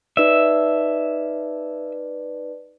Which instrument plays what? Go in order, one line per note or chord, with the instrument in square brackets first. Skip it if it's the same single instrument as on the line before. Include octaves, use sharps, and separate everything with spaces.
[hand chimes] D#4 B4 D5 [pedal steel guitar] E5